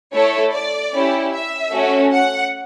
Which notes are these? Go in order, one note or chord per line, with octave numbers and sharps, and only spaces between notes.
A3 E4 A4 C#5
D5
C#4 E4 G4
E5
A3 C#4 F#4
F#5